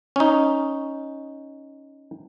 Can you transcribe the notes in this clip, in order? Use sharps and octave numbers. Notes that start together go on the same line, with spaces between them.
C#4 D#4